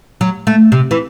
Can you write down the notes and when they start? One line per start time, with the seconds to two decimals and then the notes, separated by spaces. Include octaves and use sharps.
0.21 F#3
0.47 A3
0.72 C3
0.91 E3